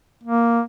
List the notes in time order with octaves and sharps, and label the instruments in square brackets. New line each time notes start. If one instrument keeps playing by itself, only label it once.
[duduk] A#3